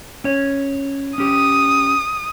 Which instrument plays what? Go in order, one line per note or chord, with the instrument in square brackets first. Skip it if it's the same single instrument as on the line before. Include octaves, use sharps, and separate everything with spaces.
[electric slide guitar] C#4 C#5
[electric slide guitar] C#4 G4 [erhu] D#6